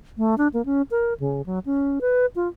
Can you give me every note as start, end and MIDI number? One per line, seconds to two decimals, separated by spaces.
0.18 0.35 57
0.38 0.48 62
0.54 0.65 58
0.66 0.82 61
0.91 1.14 70
1.20 1.42 49
1.46 1.59 54
1.66 1.99 61
2.01 2.26 71
2.36 2.48 65